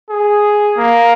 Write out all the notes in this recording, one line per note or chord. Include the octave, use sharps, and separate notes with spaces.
G#4
A#3